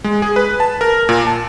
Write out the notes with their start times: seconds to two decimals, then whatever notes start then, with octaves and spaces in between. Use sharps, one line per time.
0.04 G#3
0.22 G#4
0.36 B4
0.60 A5
0.81 A#4
1.09 A#2
1.27 A5